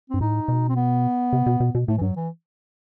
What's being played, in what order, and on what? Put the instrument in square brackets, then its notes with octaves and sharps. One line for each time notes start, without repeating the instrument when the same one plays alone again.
[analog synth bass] G2 [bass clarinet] C4
[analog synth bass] A2 [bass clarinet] D#4
[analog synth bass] B2
[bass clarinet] C4
B3
[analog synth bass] C3
B2
B2
B2
[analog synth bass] A2 [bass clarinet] A3
[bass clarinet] E3
[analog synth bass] G2 [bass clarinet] F#3
[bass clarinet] E3